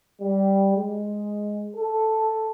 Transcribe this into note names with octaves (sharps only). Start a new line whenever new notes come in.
G3
G#3
A4